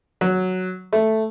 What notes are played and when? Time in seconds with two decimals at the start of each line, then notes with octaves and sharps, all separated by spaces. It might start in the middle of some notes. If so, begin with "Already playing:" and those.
0.21 F#3
0.93 A3